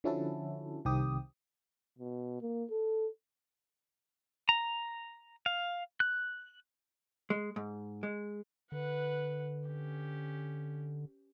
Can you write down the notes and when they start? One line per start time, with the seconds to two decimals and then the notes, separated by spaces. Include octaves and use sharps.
0.04 D3 F3 C#4 E4 F#4 A4
0.85 C2 D#3 C4 G4 D#6
1.98 B2
2.41 A#3
2.70 A4
4.49 A#5
5.46 F5
6.00 F#6
7.30 G#3
7.56 G#2
8.03 G#3
8.72 D3 B4 F#5
9.68 C#4 G4